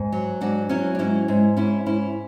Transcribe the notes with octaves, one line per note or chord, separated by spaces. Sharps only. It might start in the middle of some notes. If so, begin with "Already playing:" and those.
Already playing: G#2
F#3
G#2 D4 F#4
F#3 C#4 E4
D4
G#2 C#4 E4
G#2
G#2 C#4 E4
G#2 C#4 E4